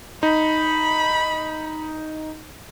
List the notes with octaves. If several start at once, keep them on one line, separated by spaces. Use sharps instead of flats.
D#4 B5